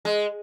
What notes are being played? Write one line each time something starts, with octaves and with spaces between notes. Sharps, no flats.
G#3